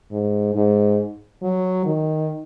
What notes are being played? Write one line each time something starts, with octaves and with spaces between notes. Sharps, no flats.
G#2
G#2
F#3
D#3